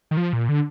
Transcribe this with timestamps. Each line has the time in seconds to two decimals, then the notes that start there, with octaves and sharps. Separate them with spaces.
0.11 D#3
0.17 F3
0.33 A#2
0.49 D3